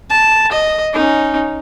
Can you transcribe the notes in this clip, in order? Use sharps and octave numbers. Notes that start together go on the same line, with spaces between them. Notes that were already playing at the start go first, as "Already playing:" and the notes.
A5
D#5
C#4 D#4